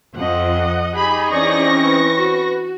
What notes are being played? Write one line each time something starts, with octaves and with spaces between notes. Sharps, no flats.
F2 D#5 F#5
D#4 G4 G#4 B5
E3 C4 C#4 D5 C#6 A#6
B4
F#4